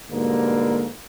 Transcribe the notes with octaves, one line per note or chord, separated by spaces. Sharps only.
G#2 B2 D3 G3 A#3